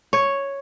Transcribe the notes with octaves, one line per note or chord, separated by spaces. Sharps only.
C#5